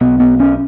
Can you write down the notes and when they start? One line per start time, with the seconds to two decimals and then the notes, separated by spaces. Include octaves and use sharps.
0.01 B1 B2 B3
0.20 B3
0.40 C#4